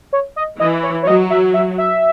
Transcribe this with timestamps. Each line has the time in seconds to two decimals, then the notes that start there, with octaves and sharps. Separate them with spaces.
0.13 C#5
0.36 D#5
0.60 E3 D#5
0.83 C#5
1.03 C#5
1.07 F#3 D#5
1.30 E5
1.54 E5
1.78 E5